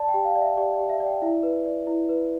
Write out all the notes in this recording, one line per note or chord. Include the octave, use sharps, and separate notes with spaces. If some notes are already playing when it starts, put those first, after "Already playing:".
Already playing: D5 A5
G5
G4
F5
D5
E5
G4 D5
D5
G4
E5
D5
G5
E4 E5
B4
D5
E4
B4